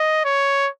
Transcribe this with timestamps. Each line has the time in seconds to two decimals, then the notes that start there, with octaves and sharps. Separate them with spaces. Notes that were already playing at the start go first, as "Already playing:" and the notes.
Already playing: D#5
0.25 C#5